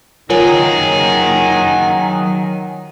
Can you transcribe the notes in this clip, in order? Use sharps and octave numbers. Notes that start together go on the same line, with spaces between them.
D#3 F#3 F4 G#4 A#4 C#5 G#5